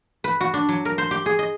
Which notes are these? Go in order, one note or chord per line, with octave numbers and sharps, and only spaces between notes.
B4
F#4
D4
F#3
A#4
C5
G4
G#4
D#5